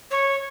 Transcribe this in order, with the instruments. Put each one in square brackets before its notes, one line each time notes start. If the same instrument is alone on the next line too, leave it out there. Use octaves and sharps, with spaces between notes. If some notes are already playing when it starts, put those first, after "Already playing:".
[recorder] C#5